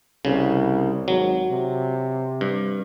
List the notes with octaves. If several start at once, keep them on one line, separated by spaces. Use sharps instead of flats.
C2 C#3
G#1 F#3
C3
G2